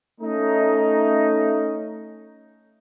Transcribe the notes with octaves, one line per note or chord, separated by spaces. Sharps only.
A3 C#4 D#4